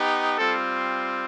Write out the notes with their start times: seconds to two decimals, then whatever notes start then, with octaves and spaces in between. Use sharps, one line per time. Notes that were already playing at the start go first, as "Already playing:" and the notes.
Already playing: B3 D#4 G4
0.38 G3 C4 F4 A4